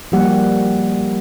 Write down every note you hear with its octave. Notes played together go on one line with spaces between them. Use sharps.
F3 G3 A#3 G4 F#5